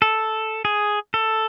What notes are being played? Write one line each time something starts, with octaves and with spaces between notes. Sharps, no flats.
A4
G#4
A4